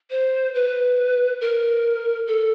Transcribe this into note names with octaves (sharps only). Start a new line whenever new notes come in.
C5
B4
A#4
A4